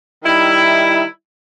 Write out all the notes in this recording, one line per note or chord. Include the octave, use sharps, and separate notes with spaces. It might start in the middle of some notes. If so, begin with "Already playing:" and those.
D#3 G3 D#4 E4